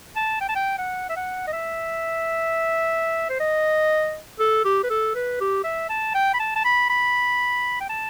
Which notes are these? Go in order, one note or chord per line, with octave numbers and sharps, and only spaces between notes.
A5
G5
A5
G5
F#5
E5
F#5
D#5
E5
C5
D#5
A4
G4
B4
A4
B4
G4
E5
A5
G5
B5
A5
A5
B5
B5
G5
A5